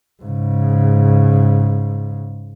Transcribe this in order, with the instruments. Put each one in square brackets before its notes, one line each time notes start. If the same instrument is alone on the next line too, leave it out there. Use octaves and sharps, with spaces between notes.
[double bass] G#2 C#3